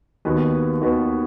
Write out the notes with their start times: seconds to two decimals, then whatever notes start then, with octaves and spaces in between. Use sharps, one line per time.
0.25 D#2 D#3 B3 F#4 B4
0.81 D#2 D#3 B3 F#4 B4